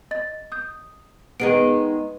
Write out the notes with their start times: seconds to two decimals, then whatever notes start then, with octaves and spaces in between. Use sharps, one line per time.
0.11 D#5 A6
0.52 D#6 G6
1.40 D#3 G#3 B3 B4 D7